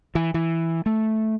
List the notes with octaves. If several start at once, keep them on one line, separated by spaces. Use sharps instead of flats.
E3
E3
A3